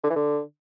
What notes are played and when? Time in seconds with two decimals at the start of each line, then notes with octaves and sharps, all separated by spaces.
0.04 D3
0.10 E3
0.16 D3